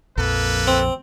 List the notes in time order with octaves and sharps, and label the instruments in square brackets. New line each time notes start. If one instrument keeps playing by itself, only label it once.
[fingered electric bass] A#1 F2 [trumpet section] A#3 A4 B4
[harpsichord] C4